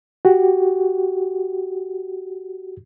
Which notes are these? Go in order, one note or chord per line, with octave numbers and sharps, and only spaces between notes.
F#4 G4